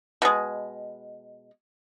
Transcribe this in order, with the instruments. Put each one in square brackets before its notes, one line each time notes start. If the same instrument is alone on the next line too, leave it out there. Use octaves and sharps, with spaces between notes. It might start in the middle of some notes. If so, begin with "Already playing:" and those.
[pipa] B2 G#3